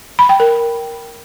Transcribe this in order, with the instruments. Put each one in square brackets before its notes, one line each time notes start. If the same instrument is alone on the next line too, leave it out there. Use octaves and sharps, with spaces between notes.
[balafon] B5
G5
A#4